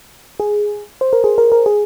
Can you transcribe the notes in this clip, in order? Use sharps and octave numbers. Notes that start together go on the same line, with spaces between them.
G#4
C5
A#4
G#4
A#4
A#4
G#4